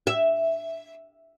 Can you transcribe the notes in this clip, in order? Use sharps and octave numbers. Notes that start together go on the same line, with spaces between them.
E5